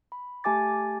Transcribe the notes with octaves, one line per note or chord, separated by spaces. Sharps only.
B5
A3 G4 G#5 A5 D6 A6